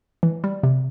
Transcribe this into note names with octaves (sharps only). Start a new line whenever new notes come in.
E3
G3
C3